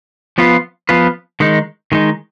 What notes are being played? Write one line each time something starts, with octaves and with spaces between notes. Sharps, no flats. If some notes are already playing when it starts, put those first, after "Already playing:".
F3 B3 F4 B4
F3 B3 F4 B4
D#3 G#3 D#4
D#3 G#3 D#4